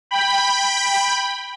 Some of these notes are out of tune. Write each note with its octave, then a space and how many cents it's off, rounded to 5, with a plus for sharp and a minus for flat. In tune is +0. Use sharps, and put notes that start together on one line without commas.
G5 +15 B5 +0